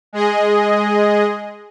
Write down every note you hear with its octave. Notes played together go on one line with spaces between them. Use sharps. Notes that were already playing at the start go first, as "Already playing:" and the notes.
G#3 G#4 D#5